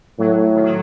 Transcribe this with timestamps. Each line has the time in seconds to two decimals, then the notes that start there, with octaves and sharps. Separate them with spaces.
0.19 A2 F#3
0.55 D#3
0.64 F#3